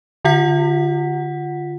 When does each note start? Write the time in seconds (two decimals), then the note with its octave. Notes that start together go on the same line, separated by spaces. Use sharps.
0.25 D3 F4 F#5 B6